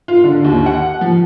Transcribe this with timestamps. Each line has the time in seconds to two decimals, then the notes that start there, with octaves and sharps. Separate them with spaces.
0.08 F4
0.24 D3
0.44 D#2
0.66 F#5
1.01 F3